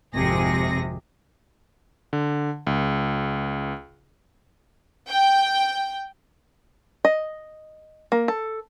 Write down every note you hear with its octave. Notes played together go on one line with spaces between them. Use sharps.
G#1 F2 C3 G#4 A#6
D3
C#2
G5
D#5
A#3
A4